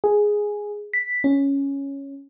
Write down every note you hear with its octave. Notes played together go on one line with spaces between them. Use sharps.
G#4
B6
C#4